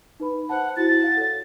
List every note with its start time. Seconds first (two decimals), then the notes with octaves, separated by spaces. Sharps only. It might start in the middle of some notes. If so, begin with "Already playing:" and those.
0.20 D#4 B4 B5
0.49 C5 F#5 A5
0.77 E4 F#4 A6
1.03 F5 F#5
1.17 A4 C#5